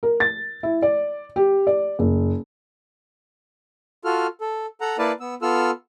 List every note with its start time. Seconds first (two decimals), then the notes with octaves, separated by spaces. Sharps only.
0.03 A#4
0.20 A6
0.63 E4
0.82 D5
1.36 G4
1.67 D5
1.99 F#1
4.05 F4 F#4 A4 F6
4.41 A4
4.81 A4 F#5 A#5
4.99 A#3 E4 B4 D5 F5 A5
5.20 B3 E6
5.42 B3 F4 A4 E6 F6